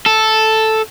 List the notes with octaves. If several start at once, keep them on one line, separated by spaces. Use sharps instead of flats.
A4